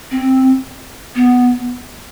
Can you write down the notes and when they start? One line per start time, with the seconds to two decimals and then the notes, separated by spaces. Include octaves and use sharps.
0.11 C4
1.15 B3